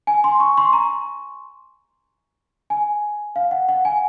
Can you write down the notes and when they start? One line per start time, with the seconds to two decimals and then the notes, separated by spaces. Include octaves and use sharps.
0.07 G#5
0.24 C6
0.40 C#6
0.58 C6
0.73 A#5
2.70 G#5
3.36 F5
3.51 F#5
3.69 F#5
3.85 G#5